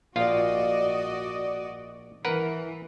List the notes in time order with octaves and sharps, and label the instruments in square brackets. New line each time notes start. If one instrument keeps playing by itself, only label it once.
[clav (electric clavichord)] A#1 F4 F5 [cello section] F#4 D5 D#5
[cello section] E3 [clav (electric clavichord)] A#4 B4 F#5